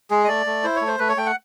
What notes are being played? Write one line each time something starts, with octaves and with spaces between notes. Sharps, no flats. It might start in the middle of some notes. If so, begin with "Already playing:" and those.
G#3 G#4
D#5
A3 D5
A3
E4 C5
C#5
A3
C5
A3 B4
C#5
A3 G5
F#5